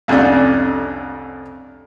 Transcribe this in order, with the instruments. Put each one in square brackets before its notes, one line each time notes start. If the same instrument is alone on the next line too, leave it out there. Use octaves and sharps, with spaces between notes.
[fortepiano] C2 F2 A3 C#4 D4